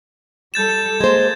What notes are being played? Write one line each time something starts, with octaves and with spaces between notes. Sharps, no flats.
G3 A4 G6 A6 E7
G#3 A#3 C5 G#6